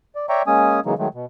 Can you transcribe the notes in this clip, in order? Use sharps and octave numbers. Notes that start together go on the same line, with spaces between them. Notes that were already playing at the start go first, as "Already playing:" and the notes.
D5
C#5 D5 E5 G5 A#5 C#6
G#3 A#3 C#4 G#5 D#6
C#3 E3 F#3 G#3 A#3 D#4
D#3 F#3 G#3 A3
B2